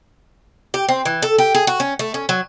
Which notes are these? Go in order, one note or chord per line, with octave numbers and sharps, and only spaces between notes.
G4
C4
E3
A4
G4
G#4
F#4
C#4
A3
C#4
F#3